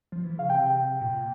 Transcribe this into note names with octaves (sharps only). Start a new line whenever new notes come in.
F3
E3
C#3 F5
C3 G5
A#2